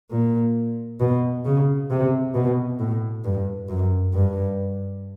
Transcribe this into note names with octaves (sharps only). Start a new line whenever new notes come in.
A#2
B2
C#3
C3
B2
A2
G2
F#2
G2